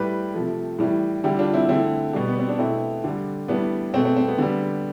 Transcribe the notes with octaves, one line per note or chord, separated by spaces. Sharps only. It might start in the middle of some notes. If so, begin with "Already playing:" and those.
Already playing: A2 G3 G4 B4
C3 F3 A3
A2 E3 G3
D3 G3 E4 G4
D4 F4
C4 E4
D3 A3 C4 E4
B2 G3
B3
C4
D4
B2 A3 C4 E4
D3 G3
A2 G3 B3 D4
B2 A3 C4
C4
C4
B3
D3 G3 B3